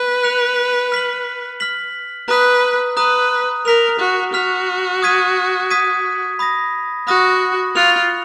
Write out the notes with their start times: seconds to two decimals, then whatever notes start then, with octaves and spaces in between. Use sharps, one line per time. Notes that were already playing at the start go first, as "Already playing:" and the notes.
Already playing: B4
0.23 F#6 C#7 F7
0.92 F6 B6 F#7
1.60 F6 B6 F#7
2.28 B4 A#5 D#6 F#6
2.97 B4 A#5 D#6 F#6
3.65 A#4 F6 B6 F7
3.99 F#4
4.33 F#4 F6 B6 F7
5.02 D#6 G#6 B6 D#7
5.70 D#6 G#6 B6 D#7
6.39 B5 D#6 A#6
7.07 F#4 B5 D#6 A#6
7.75 F4 C#6 F#6 C#7 F7